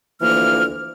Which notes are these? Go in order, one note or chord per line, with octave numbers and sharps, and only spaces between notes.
D2 E3 F3 A#3 F6